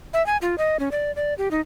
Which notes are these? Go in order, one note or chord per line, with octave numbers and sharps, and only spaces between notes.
E5
G#5
F4
D#5
C#4
D5
D5
G4
D#4